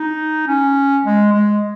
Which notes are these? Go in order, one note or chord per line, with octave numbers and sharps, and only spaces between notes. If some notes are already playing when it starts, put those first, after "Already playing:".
Already playing: D#4
C#4
G#3
G#3